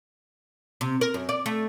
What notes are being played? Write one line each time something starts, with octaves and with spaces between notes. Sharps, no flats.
C3
A#4
F#2
D5
A3